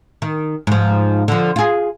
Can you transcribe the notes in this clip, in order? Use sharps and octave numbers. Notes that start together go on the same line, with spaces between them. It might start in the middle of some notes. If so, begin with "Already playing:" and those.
D#3
G#2 F3
D3 F3
F4 G#4